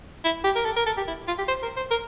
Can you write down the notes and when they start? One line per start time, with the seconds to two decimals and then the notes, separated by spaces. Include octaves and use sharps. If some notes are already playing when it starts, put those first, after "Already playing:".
0.24 E4
0.44 G4
0.55 A#4
0.65 A4
0.77 A#4
0.86 A4
0.97 G4
1.08 E4
1.28 F4
1.38 G4
1.48 C5
1.63 A#4
1.77 C5
1.91 A#4